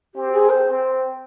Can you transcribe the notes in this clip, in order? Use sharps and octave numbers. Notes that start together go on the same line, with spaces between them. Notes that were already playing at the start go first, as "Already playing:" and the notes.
C4 G4
G#4
C5
C4